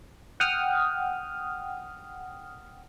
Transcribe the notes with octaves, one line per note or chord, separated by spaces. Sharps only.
F#5 G5 D#6 F6